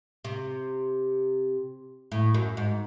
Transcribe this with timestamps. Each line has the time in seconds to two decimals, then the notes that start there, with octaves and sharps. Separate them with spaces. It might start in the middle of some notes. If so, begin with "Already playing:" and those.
0.24 C3
2.12 A2
2.34 F#2
2.57 G#2